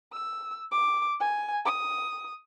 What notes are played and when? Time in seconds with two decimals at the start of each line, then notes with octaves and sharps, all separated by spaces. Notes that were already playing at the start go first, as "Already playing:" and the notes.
0.13 E6
0.72 D6
1.20 G#5
1.66 D#6